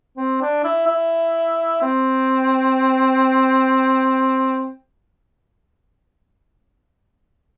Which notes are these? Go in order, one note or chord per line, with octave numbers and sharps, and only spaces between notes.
C4
D4
E4
E4
C4